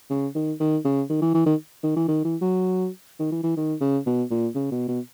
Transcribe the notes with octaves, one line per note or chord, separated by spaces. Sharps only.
C#3
D#3
D#3
C#3
D#3
E3
E3
D#3
D#3
E3
D#3
E3
F#3
D#3
E3
E3
D#3
C#3
B2
A#2
C#3
B2
B2